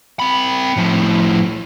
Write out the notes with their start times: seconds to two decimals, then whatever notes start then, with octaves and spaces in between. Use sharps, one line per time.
0.20 C4 B5
0.77 A2 F3